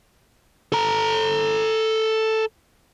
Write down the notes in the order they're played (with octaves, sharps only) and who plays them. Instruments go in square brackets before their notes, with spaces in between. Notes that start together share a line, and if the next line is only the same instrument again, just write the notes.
[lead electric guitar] A4 A#5